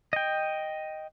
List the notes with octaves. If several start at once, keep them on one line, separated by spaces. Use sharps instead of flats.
D#5 G5